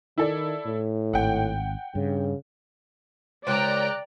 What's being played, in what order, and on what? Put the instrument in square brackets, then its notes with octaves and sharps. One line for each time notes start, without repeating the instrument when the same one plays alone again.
[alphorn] D#3 [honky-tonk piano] E4 A4 D5
[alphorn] A2
[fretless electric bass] G#1 [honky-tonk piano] F#5 G5
[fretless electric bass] G2 [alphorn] C#3
[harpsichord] C#2 C#3 C4 [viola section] D5 [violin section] G5 A#5 [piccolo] F#6